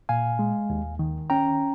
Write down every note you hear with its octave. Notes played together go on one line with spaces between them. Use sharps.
A#2 F5 G#5
G#3
D#2
D#3
C#4 G5 A#5